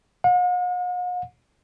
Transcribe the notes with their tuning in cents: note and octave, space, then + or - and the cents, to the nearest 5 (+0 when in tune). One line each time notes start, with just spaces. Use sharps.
F#5 -45